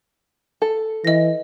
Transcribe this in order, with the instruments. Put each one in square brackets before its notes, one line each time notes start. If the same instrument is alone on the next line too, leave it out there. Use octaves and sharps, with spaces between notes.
[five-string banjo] A4
[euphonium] E3 [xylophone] D#5 A#6